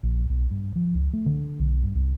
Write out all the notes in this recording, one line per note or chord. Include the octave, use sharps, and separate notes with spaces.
A#1
B1
G2
F3
C#2
A3
D3
B1
G2
C2